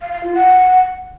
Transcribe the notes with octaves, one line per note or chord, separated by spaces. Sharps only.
F5
F5
F4
F#5